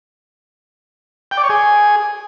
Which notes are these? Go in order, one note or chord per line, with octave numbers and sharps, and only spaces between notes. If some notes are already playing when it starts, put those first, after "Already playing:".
G5
D5
C#5
G#4